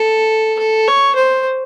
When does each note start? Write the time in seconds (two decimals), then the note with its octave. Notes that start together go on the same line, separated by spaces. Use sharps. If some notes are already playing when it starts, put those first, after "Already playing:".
Already playing: A4
0.59 A4
0.87 C#5
1.15 C5